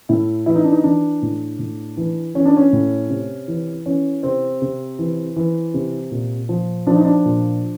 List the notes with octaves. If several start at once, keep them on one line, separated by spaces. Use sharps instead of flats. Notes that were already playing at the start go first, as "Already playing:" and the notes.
A2 E4
E3 E4
D#4
D4
D#4
E3 D4
A2
A2
E3
E3 C#4
D4
C#4
A2
C3
E3
E3 C#4
C3 C4
C3
E3
E3
C3
A#2
F3
F3 D4
D#4
D4
A#2